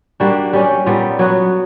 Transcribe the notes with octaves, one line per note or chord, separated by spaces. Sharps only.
G3 A#3 D4 F#4
G3 C#4 G4
A#2 G3 B3
F#3 B3 F#4